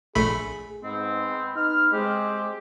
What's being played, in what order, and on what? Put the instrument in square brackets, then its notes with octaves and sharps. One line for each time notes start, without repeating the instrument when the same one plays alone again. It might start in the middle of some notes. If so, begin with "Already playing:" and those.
[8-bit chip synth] A#1 A3 B5 [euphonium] G#4
[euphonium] G#2 [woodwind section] G#3 B3 C4
[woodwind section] B3 F6 [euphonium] D#4
[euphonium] G#3 [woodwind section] C4 G4